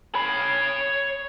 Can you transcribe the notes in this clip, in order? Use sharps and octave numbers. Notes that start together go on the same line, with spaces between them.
C#5 B5